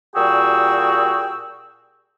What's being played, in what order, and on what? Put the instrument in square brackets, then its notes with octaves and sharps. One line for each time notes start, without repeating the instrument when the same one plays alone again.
[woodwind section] A#2 G3 F#4 G#4 G5 E6